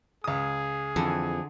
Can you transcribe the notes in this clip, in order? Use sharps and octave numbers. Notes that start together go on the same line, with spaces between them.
C#2 G#4 D#6
F2 D3 E3